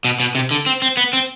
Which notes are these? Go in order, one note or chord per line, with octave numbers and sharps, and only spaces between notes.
B2
B2
C3
D3
C4
C4
B3
C4